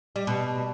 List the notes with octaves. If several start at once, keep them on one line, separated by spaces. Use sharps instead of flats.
G3
B2